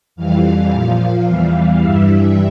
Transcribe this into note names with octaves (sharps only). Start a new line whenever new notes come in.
F2 E3 G3 F5
A#2 F3
E2 E3 G3
G2 E3 G3 E5